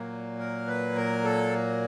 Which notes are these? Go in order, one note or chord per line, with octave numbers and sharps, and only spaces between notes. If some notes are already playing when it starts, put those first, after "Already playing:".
Already playing: A#2 F#3 A#3
A#4
B4
A#4
A4